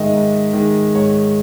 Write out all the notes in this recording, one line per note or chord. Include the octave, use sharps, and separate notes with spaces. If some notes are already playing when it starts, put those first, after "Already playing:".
Already playing: G#2 D#3 G#3 D#5 E5
G#2
D#3 G#3
G#2 C#5